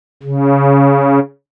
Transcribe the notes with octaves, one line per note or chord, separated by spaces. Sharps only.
C#3